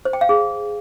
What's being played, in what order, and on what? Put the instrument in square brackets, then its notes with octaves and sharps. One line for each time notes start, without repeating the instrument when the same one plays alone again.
[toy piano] C5
G5
F5
G#4